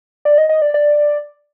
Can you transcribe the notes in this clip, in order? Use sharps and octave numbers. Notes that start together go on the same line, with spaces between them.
D5
D#5
D#5
D5
D5